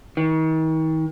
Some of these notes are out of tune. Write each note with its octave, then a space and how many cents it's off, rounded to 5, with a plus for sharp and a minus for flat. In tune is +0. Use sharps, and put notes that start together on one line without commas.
D#3 +40